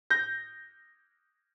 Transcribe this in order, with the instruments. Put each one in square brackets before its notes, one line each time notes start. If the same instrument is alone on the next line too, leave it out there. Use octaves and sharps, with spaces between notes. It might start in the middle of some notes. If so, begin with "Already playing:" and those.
[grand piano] G6 A#6